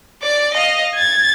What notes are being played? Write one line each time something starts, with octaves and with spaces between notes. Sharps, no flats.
D5 D6
D#5 F5
G#6 A6